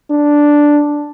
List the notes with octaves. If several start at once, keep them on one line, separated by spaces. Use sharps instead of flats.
D4